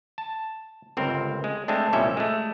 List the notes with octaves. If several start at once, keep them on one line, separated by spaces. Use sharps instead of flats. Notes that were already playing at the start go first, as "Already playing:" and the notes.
A5
G1 C#2 C4 A#4
G#3
G#3 A3 C4 D4
C2 F2 A#2 G3 C#4 E5
G#3 A3